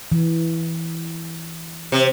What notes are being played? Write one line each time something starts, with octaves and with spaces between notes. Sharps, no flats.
E3
C3